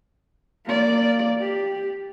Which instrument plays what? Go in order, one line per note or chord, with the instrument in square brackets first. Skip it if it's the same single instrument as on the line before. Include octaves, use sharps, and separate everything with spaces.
[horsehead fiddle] A#3 D5
G4